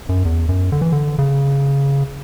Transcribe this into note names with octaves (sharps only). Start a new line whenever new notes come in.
F#2
E2
F#2
D3
E3
D3
C#3